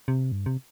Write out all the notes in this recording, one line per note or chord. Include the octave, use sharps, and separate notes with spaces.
C3
G2
C3